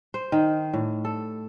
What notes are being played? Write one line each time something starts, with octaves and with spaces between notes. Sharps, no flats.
C5
D#3
A2
A4